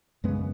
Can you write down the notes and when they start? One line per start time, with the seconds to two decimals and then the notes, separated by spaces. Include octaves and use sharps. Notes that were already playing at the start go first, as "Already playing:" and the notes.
0.24 F#2 C#3 G#3 B3